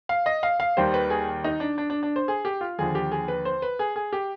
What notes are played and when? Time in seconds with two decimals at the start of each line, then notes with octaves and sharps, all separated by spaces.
0.09 F5
0.26 D#5
0.43 F5
0.60 F5
0.77 D#2 D#3 G3 C5
0.94 B4
1.10 G#4
1.44 D#4
1.60 D4
1.78 D4
1.90 D4
2.03 D4
2.16 C5
2.28 G#4
2.45 G4
2.61 F4
2.78 D#2 D3 F3 G#4
2.95 G4
3.11 G#4
3.28 B4
3.45 C5
3.62 B4
3.79 G#4
3.96 G#4
4.13 G4